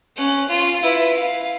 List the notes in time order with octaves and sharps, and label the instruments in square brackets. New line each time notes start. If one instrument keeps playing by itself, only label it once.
[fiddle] C#4 F#6
F4
E4 B4
F5